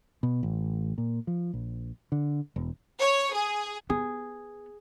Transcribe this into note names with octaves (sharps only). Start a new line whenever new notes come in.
B2
A1
A#2
F3
A#1
D3
E1
C#5
G#4
B3 G#4